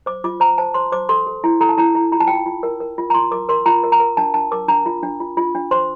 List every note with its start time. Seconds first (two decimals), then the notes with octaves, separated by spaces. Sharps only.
0.06 C5 D6
0.24 F4 D6
0.40 C5 A#5
0.58 C5 A5
0.74 C5 C6
0.92 C5 D6
1.09 A4 C6
1.27 A4
1.44 E4
1.61 A4 A#5
1.69 A5
1.77 E4 A#5
1.95 E4
2.12 F4 A#5
2.20 A5
2.27 F4 G5
2.35 A5
2.46 F4
2.63 A#4
2.80 A#4
2.98 F4
3.10 A#5
3.14 F4 C6
3.31 A#4 D6
3.49 A#4 C6
3.66 F4 A#5
3.84 A#4
3.92 A#5
4.00 A#4
4.17 D4 A5
4.34 D4 A5
4.52 A#4 D6
4.68 D4 A#5
4.86 F4
5.03 D4
5.20 F4
5.37 F4
5.55 D4
5.71 C5 C6